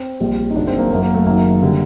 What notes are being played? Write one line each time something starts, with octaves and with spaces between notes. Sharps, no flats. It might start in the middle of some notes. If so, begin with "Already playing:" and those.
Already playing: C4
A#1 A#2 G3
D#4
F#1 F#2 D#3 F#3 D4
C4
A#3
F#2 F#3 A#3
A#3
A3
F#1 F#2 D#3 F#3 A#3
D3 G3